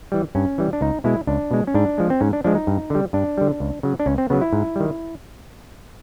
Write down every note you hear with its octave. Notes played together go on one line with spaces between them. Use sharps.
E3 G3
G2 C#4
E3 G3
D4
C#2 D#4
B2 G#3 E4
C#2 D4
B2 G#3
C#4
G#2 D4
F3 G#3
C4
G#2 C#4
D4
F3 G#3 D4
D#4
G2
D3 G3
G2 D4
D3 G3
C#2
C#3 F#3
D4
C#2 C#4
C4
C#3 F#3 B3
E4
G#2
D#3 G3